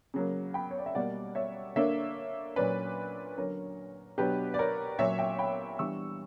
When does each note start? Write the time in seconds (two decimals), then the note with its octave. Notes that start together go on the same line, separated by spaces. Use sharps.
0.14 C#3 F#3 A#3
0.54 G5 B5
0.71 C#5
0.78 D5
0.86 E5
0.95 B2 G3 A#3 D5 F#5
1.35 C#5 E5
1.76 D3 A#3 D4 C#5 E5
2.56 A#2 F#3 C#4 B4 D5
3.38 D3 F#3 C#4 A#4 C#5
4.18 B2 F#3 B3 D4 G4 B4
4.54 D5
4.59 A#4 C#5
4.99 A#2 F#3 C#4 C#5 E5
5.19 E5 G5
5.39 G5 B5
5.79 E3 G3 B3 D4 C#6 E6